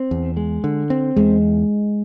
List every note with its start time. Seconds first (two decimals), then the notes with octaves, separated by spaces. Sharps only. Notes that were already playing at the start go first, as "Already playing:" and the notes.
Already playing: C4
0.11 E2
0.37 G#3
0.64 D3
0.90 C4
1.17 E2 G#3